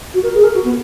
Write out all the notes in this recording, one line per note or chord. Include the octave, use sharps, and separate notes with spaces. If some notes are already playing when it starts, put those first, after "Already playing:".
F#4
A#4
G#4
A#4
F#4
B3